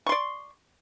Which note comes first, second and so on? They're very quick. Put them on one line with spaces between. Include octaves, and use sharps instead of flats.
C#6 C6 D5